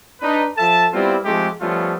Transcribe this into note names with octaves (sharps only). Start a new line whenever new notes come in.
D4 D#4 B4
F3 A4 E5 A5
G3 B3 C4 E4 F4
F3 G#3 A3 C4 D#4 G4
F3 G3 A3 B3 C#4 F4